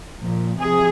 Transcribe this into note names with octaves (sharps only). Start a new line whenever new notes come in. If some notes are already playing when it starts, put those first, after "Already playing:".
A#2 F3
C3 F3 G#4